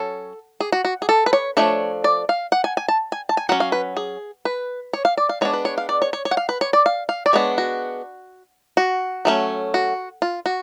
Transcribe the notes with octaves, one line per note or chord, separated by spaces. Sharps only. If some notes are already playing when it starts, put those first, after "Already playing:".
Already playing: F#3 C#4 A4
G#4
F#4
F#4
G#4
A4
B4
C#5
F3 A3 D4 C#5
D5
F5
F#5
G#5
G#5
A5
G#5
A5
G#5
F#3 C#4 F#5
F5
B4
G#4
B4
C#5
F5
D5
F5
G#3 B3 D4 C#5
B4
C#5
F5
D5
C#5
C#5
C#5
F#5
F5
B4
C#5
D5
F5
F5
D5
G#3 B3 D4 C#5
F#4
F#4
F#3 A3 C#4
F#4
F4
F#4